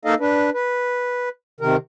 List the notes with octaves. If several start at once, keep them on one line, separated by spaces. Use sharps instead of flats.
A#3 D#4 A4 D#5 F5
D4 B4
B4
C3 D#3 A#4